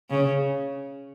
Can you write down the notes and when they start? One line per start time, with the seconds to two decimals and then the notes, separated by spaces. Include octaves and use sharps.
0.10 C#3